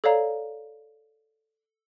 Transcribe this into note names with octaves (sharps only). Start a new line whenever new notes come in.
A4 C#5 D5 F5 A#5